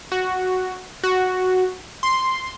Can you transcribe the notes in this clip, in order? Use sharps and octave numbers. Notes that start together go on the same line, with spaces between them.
F#4
F#4
C6